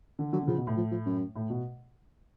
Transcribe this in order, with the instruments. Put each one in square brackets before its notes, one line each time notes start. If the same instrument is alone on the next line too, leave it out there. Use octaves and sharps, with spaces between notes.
[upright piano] D3
[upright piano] D3 [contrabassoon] F#3
[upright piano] D3
[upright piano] C#3 [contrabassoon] F3
[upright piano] B2
A2
[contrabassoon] F3
F3
F#2
[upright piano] A2
B2